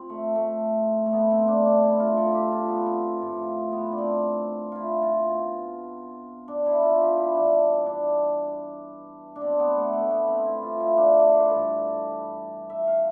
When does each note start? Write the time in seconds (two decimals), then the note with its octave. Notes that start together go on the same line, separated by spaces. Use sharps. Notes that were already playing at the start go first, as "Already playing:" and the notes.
Already playing: F3 C4
0.10 A3
0.35 A3
1.06 A3
1.13 B2 B3
1.31 C4
1.48 D4
1.65 D4
1.82 E4
2.00 F4
2.17 A4
2.34 G4
2.52 F4
2.69 B3
2.86 C4
3.21 A2 F3
3.72 B3
3.92 D4
3.98 C4
4.72 E4 F4
5.02 F4
5.27 B2
6.48 D4
6.66 E4
6.82 F4
7.01 G4
7.17 E4
7.35 G2 E3 D4
7.86 D4
9.36 D4
9.41 B2 C4
9.60 B3
9.77 A3
9.93 A3
10.11 B3
10.28 C4
10.45 E4
10.62 F4
10.80 E4
10.97 D4
11.20 D5
11.29 C5
11.40 B4
11.49 G2 E3 A4
12.70 E5
12.87 F5